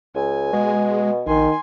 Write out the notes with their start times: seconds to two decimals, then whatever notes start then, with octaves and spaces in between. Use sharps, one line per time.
0.15 C#2 G#5
0.53 B2 G#3
1.27 A#1 D#3 G#5 C6